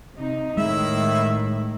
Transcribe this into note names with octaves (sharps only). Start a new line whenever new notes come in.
C3 D#4
A2 D#3 G#3 E4 E5